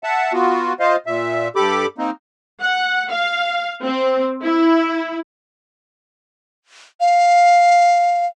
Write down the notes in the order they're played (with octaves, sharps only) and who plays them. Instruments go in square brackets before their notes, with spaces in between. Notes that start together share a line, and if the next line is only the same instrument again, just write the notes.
[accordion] E5 F#5 A5
B3 F4 F#4
F4 C5 D#5 F5
A#2 E5
G2 G4 A4 B5 D6
A#3 C4 D#4
[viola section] F#5
F5
C4
E4
[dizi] F5